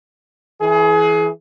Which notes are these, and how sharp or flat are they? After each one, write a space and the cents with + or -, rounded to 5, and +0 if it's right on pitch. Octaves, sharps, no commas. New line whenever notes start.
E3 +0 G#4 +30